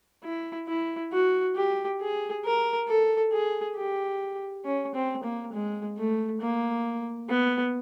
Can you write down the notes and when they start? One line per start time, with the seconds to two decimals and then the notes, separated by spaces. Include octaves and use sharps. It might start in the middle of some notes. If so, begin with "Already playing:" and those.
0.24 E4
0.68 E4
1.12 F#4
1.56 G4
2.01 G#4
2.45 A#4
2.88 A4
3.32 G#4
3.77 G4
4.65 C#4
4.95 C4
5.24 A#3
5.53 G#3
5.98 A3
6.41 A#3
7.30 B3